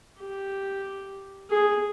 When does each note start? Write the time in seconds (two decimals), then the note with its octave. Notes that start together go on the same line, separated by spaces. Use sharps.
0.19 G4
1.50 G#4